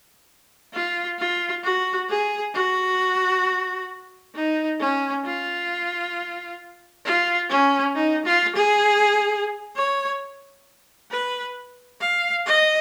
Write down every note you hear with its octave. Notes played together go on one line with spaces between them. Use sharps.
F4
F4
F#4
G#4
F#4
D#4
C#4
F4
F4
C#4
D#4
F4
G#4
C#5
B4
F5
D#5